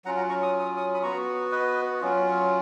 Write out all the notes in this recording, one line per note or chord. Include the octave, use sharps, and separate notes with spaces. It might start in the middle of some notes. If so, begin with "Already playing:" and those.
F#3 C#4 F4 F#5 A#5
F#5 A#5
A#5 C#6
D#6
D#6
D#6
B5 D#6
B3 F#4 A#5 C#6
B4 D#5
F#3 C#4 F4